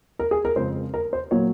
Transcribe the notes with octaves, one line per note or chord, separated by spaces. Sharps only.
A#4
G#4
A#4
F2 C#3 F3 G#3 C4 C5
A#4
C5
A#2 F#3 A#3 C#5